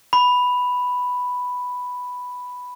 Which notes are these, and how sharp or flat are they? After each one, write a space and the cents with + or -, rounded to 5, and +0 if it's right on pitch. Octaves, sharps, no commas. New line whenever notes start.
B5 +5